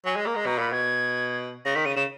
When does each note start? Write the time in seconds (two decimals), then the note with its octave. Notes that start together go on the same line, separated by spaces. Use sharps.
0.05 F#3 G#5
0.16 G#3
0.26 A#3 A#5
0.35 G#3
0.46 B2 A#5
0.58 A#2 B5
0.72 B2 G#6
1.65 C#3 A#6
1.75 D#3 B6
1.85 C#3 D#7
1.96 C#3 E7